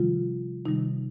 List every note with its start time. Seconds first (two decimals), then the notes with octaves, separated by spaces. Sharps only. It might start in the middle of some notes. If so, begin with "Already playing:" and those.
Already playing: C3 D#3 F3 G3 F4
0.65 C3 D#3 G3 D#4